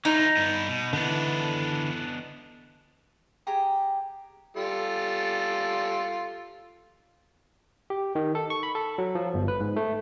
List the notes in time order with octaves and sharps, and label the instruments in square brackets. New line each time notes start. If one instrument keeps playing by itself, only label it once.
[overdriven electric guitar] E3 F4 [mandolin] D#4
[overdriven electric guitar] G2 B3
B2
[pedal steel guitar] D3 E3 [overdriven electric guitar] B3 D4
[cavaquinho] G4 G#4 A#5
[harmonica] G3 F4 A4
[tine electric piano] G4
D#3
A4
C#6
B5
A4
F#3
F3
G1
B4
G#2
A3